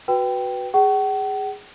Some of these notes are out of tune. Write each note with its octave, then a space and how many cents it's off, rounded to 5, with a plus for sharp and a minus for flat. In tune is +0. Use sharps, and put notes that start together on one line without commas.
F#4 +0 B4 +0 G5 -5
G#4 -15 F#5 +45